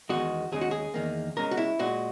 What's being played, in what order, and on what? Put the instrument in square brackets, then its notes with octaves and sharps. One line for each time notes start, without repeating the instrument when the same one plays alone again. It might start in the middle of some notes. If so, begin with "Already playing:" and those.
[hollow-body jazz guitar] E2 D#3 G#3 F#4
D#2 C#3 G#3 G#4
F#4
G#4
E2 D#3 A#3
C#2 C#3 G#3 A#4
F#4
E4
A#2 G#3 F#4